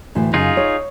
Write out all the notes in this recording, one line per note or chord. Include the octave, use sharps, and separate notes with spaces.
D2 A2 E3
F#2 C#3 D#4 F4 G#4
C#5